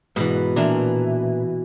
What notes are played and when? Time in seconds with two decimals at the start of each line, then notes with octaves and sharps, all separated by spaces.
0.16 G#2 B2 E3
0.56 A#2 E3 D4 A#4